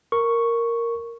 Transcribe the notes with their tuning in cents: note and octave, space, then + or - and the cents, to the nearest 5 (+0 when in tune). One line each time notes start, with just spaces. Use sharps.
A#4 -5 C#6 +0